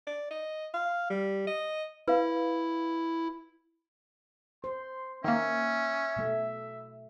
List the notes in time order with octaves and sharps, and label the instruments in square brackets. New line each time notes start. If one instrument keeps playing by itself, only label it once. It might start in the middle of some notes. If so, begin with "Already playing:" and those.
[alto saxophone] D5
D#5
F5
G3
D#5
[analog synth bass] E4 [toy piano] B4 F5
[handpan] C5 [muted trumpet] C6
[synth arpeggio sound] D#3 A#3 [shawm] C#4 [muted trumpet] E5
[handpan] B2 A3